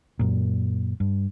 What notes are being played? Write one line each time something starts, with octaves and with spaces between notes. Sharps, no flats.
F#2 A#2
G2